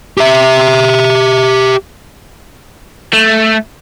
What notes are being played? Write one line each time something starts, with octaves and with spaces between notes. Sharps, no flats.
G4 E5
A3